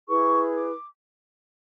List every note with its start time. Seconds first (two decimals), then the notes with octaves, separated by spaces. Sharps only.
0.07 E4 G#4 B4 C#6
0.52 D6